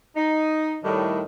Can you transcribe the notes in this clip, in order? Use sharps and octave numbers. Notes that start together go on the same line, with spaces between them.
D#4
A2 D#3 G3